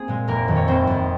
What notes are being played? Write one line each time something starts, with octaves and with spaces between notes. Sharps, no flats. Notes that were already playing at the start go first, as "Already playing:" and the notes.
Already playing: A#3 C4 G#4
A#2 G#3
F1 A#3 A#4
F2 D#3
C#5
F1 C4 C5
F2 D#3